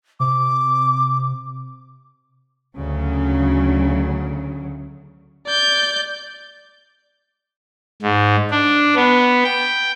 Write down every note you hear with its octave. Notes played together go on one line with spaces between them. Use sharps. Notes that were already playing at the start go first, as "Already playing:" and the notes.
C3 D6
D2 C#3 F#3
D5 G6
G#2
D4
B3
G5